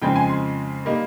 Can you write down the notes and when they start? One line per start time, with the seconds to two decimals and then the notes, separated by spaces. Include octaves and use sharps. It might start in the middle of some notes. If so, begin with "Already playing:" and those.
0.02 F2 C#3 G#3 C4 D#4 G5
0.16 G#5
0.29 C6
0.86 G3 A#3 D#4